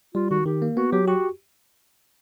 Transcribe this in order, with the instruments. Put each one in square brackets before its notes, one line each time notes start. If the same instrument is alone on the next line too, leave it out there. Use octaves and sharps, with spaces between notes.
[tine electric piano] G3 [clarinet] F4
[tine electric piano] D#3 [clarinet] F#4
[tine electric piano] D#3 [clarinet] G4
[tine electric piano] A#3
[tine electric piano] B3 [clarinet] F#4
[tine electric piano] F#3 [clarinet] G4
[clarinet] F#4 [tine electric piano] G4